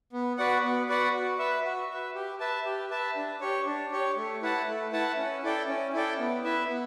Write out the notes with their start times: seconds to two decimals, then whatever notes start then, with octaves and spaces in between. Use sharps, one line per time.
0.13 B3
0.38 F#4 B4 D5 F#5
0.63 B3
0.89 F#4 B4 D5 F#5
1.14 F#4
1.39 B4 E5
1.64 F#4
1.90 B4 E5
2.15 G4
2.40 B4 E5 A5
2.66 G4
2.90 B4 E5 A5
3.15 D4
3.41 G4 C#5
3.66 D4
3.91 G4 C#5
4.16 A3
4.42 E4 B4 F#5 A5
4.67 A3
4.92 E4 B4 F#5 A5
5.17 C#4
5.43 E4 A4 D5 G5
5.68 C#4
5.93 E4 A4 D5 G5
6.19 B3
6.44 E4 B4 E5
6.69 B3